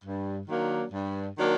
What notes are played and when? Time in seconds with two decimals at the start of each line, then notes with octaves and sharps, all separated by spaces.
0.04 G2
0.48 D#3 F#3 A#3 D4
0.92 G2
1.38 D#3 F#3 A#3 D4